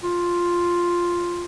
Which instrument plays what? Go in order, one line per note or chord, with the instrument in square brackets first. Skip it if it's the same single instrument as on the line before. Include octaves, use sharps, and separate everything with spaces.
[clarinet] F4